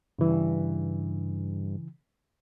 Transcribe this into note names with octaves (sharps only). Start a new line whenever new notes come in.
G2 C#3 E3